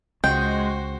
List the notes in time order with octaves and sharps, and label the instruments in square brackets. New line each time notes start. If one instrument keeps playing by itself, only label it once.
[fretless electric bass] C#2 [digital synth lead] G#3 [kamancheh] F#4 C5 [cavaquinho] G5